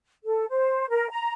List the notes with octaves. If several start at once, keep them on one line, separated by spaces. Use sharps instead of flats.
A4
C5
A#4
A#5